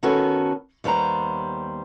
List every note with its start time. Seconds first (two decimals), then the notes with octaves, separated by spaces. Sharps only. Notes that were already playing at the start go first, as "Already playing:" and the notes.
0.03 D#3 B3 C#4 F#4 A4
0.84 D#2 G3 B3 C5 A#5